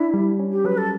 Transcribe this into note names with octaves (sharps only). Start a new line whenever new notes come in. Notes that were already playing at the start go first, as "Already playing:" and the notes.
Already playing: D4 E4
G3
C#4
G4
F#3 B4
A4